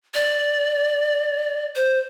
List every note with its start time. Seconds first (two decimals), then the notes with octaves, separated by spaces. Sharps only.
0.14 D5
1.76 C5